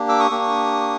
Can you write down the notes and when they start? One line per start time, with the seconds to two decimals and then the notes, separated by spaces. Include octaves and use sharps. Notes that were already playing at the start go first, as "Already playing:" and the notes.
Already playing: A#3 D4 G4
0.09 D6 E6
0.20 C#6 D#6
0.30 A#3 D4 G4